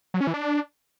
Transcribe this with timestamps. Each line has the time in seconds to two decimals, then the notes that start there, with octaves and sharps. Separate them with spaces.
0.14 F#3
0.21 C#4
0.27 E3
0.34 D4